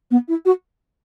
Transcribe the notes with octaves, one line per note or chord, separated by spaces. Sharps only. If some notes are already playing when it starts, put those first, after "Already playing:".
B3
E4
F#4